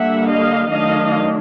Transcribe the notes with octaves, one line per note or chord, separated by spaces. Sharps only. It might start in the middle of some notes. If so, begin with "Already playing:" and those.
Already playing: D3 G3 A#3 D4 E5 F#5
D#5 F5
D#3 F#3 A3 D4 D#5 F5